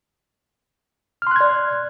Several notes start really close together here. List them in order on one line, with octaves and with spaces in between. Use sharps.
F6 C6 F#6 G#6 D5